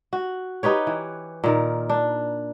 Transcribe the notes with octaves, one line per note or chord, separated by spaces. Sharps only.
F#4
D#4 G4 B4 C#5
E3
A#2 D#3 A#4
D4